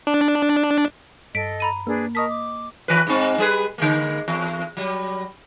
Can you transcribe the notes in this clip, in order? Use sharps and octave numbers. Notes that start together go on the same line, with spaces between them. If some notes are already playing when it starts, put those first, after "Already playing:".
D4
G2 A4 D#5 B6 D7
A#5 B5 D#7
A#3 D4 G#4 B4
A#4 D#5 A5 C#6 D#6 B6
D6
E3 B4
G#2 C4
G3 G#4 B4
D3 G#3 A#3
E2
F#3 G3